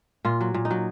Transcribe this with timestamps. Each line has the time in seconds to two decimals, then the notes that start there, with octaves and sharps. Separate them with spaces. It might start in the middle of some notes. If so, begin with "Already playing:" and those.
0.25 A#2 F4
0.41 F#3
0.54 A#2
0.65 D#4
0.71 F#3